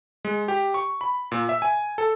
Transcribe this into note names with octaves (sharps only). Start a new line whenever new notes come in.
G#3
G4
C#6
B5
A#2
E5
G#5
A4